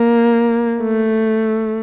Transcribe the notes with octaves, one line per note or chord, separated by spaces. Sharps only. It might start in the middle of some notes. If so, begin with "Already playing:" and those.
Already playing: A#3
A3